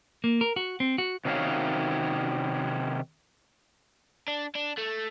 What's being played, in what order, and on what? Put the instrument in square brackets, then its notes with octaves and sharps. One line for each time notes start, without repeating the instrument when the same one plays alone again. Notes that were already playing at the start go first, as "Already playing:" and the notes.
[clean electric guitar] A#3
A#4
F#4
C4
F#4
[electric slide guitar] C3 D#3 C#4 F#4 C#5 F5
[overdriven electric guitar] D4
D4
A3